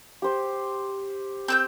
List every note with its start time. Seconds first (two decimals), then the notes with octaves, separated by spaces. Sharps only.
0.22 G4 C5
1.48 C4 E6 G6